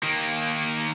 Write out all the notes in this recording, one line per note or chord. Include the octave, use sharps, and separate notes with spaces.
D#3 A#3